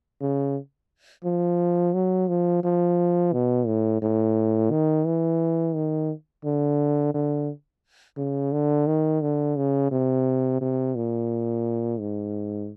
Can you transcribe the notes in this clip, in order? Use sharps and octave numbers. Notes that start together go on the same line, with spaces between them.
C#3
F3
F#3
F3
F3
B2
A2
A2
D#3
E3
D#3
D3
D3
C#3
D3
D#3
D3
C#3
C3
C3
A#2
G#2